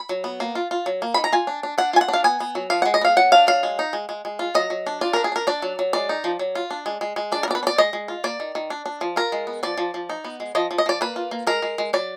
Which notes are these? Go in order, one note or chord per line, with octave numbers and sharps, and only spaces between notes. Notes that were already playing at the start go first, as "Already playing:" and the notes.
Already playing: B5
F#3
B3
A#3
F4
F4
F#3
A#3
D#3 B5
A#5
F4 G#5
D4
D4
D4 F#5
F4 G#5
F#5
D4
F5
B3 G#5
B3
F#3
F3 F5
G#3 F#5
D#5
B3 F5
F#3 F#5
D4 F5
F#3 F5
G#3
D#4
G#3
G#3
G#3
F4
F#3 D#5
F#3
D4
F4 D5
D4 A#4
G#4
D4 A#4
D4 D5
F#3
F#3
G#3 D5
D#4
F3
F#3
F4
D4
G#3
G#3
G#3
D4 D5
A#4
B3 D5
B4
D4
D5
G#3 D#5
G#3
F4
A#3 D5
D#3
D#3
D4
D4
F3
F4 A#4
G#3
B3
F3 D5
F3
F3
D#4
B3
G#3
F3 D#5
F3
D#5
F3 D5
A#3 B4
F4
A#3
G#3 A#4
G#3
G#3
F#3 D5